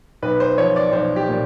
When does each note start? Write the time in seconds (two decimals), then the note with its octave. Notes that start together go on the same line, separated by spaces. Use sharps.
0.22 B1 B4
0.40 C5
0.58 F3 C#5
0.76 D5
0.92 B1 C5
1.16 G4
1.29 A#2